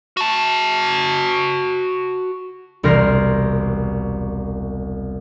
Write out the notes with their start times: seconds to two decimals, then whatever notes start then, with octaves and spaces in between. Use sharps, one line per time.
0.17 F#4 A5
2.83 E1 C2 A#4 F6 A#6 C7